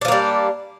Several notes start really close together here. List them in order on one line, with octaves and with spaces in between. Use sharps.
D4 F3 A#3 G3